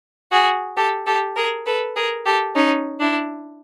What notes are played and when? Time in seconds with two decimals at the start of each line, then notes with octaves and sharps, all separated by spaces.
0.31 F#4 G#4
0.76 G4 A4
1.06 G4 A4
1.36 G#4 A#4
1.66 A4 B4
1.95 G#4 A#4
2.25 G4 A4
2.55 C#4 D#4
3.00 D4 E4